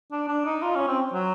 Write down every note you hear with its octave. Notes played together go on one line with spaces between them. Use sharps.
D4
D4
D#4
F4
C#4
C4
F#3